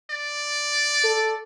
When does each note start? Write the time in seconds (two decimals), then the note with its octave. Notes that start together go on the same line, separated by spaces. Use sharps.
0.10 D5
1.04 A4